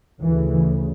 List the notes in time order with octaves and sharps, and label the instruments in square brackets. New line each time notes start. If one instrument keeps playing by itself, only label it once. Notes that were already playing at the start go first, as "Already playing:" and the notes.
[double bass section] D2 C#3 E3